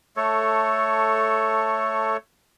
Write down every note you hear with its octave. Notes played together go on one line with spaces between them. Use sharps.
A3 A4 C#5